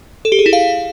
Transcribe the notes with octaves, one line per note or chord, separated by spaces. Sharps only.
A4
G4
G#4
E4
F5